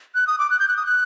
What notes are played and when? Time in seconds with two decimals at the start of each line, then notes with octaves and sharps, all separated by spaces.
0.15 F#6
0.27 D#6
0.39 D6
0.50 F#6
0.60 G6
0.68 F#6
0.77 D#6
0.86 F#6